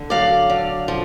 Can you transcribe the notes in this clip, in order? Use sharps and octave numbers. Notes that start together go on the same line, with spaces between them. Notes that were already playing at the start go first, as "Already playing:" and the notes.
Already playing: D3
F#3 D5 F5
D3
F3